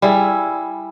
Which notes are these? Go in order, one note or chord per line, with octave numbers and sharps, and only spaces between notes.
G3 E4 G#4